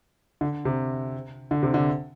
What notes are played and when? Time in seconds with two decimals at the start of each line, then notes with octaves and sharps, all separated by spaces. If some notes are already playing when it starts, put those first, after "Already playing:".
0.41 D3
0.65 C3
1.51 D3
1.63 C3
1.74 D3